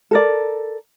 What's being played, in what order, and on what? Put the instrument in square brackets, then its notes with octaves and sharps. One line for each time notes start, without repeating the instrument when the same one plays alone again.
[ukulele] A4 A#4 D5